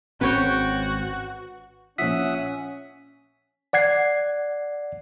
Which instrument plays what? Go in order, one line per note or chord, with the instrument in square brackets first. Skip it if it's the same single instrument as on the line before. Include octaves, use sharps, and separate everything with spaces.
[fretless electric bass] G#1 C4 C#4 [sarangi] F#4 [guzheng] B4 C#5 G5
[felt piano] A#1 F3 [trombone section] C#4 [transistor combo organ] E5 F#5 D#6 [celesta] B6
[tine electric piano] D5 F#5 G#6 C7